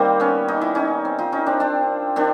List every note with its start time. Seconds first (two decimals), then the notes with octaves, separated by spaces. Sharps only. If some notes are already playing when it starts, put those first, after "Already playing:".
Already playing: D#3 G3 A#3 C4
0.20 B3 C#4
0.48 D#4
0.61 E4
0.75 C#4 D#4
1.05 C4
1.19 D#4 F4
1.32 C#4 D#4
1.46 C4 D4
1.60 C4 D4
2.16 D#3 C4 D4